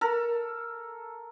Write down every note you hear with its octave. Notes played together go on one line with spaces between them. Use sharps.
A4 A#4